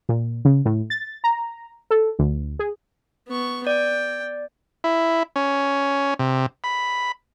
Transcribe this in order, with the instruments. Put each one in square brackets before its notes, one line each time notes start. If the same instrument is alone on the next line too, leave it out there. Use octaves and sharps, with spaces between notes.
[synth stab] A#2
C#3
A2
A6
A#5
A4
D2
G#4
[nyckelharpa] B3 C#6
[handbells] D5 [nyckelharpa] G5
[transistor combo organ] E4
C#4
C3
B5